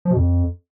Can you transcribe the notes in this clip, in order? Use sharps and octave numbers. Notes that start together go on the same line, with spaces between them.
F3
B2
F2